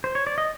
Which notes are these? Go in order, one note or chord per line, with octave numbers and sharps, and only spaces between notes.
C5
C#5
D5
D#5